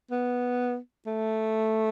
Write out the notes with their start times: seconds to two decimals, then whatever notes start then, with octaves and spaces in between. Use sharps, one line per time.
0.11 B3
1.07 A3